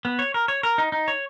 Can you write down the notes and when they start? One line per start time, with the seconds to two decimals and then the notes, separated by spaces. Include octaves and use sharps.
0.05 B3
0.19 C#5
0.34 A#4
0.48 C#5
0.63 A#4
0.78 D#4
0.92 D#4
1.08 C#5